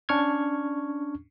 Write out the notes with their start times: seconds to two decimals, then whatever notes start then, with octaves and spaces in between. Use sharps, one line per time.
0.09 C#4 D4 C#6 F6 G#6